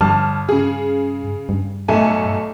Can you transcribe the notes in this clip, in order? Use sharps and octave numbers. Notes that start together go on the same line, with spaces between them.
G1 G2 A5 F6
C#3 G#4
G2
B1 A3 G#5